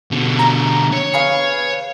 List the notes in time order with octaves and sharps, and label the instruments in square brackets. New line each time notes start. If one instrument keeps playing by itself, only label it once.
[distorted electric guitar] B2 D3
[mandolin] A#5
[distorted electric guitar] C#5
[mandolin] G#4 B4 F5